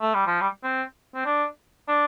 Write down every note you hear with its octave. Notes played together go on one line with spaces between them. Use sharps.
A3
G3
F3
G3
C4
C4
D4
D4